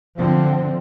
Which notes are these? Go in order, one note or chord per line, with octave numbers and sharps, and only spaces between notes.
D3 F3 C4